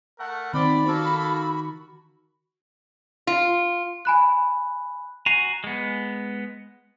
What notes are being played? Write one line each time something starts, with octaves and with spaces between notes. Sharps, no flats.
A3 A#4 F#5
D#3 C4 D5 B5
A#3 F#4 A4
F4
G#5 B5 F#6
F#4 G#5 A#5 C7
G#3 B3